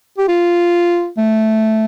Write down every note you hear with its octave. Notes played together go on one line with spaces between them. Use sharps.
G4
F4
A3